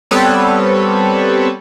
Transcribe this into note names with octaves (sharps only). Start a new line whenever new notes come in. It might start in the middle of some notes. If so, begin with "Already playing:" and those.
G3 B3 C4 A4 B4 C#5